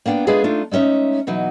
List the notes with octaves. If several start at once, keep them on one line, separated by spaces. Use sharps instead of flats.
A#3 B3 D4 F#5 G5
G#3 A3 D4 F4 G#4 B4
A3 D4 D#4 F4
G#3 A3 C#4 D#4 E5
B2 E3 F#3 D#4